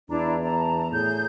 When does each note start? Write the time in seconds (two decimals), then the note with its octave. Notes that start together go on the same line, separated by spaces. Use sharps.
0.10 E2 D4 E4 A#5
0.43 A5 A#5
0.92 A2 G#4 G6